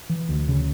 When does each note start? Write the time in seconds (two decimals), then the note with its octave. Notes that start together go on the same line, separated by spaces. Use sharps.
0.09 E3
0.29 D2
0.48 C#3